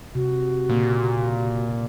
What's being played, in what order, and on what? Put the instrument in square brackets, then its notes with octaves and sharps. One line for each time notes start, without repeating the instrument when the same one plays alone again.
[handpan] C3 [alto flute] F#4
[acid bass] A#2 [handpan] C#3 A#3